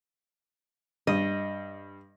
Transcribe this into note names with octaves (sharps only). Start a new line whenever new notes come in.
G2 D#5